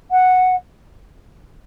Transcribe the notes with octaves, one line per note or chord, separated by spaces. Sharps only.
F#5